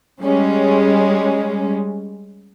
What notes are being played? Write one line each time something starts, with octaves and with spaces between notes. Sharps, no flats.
G3 G#3 C#4